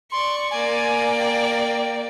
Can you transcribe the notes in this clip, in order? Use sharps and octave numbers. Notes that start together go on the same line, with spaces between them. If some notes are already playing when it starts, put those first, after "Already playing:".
D5 C6 C#6
A#3 D5 G#5
G5